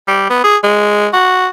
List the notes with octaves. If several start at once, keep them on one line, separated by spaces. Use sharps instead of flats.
G3
B3
G#4
G#3
F#4